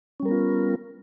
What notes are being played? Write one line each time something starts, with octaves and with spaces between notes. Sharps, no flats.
G3 B3 C#4 F4 A#4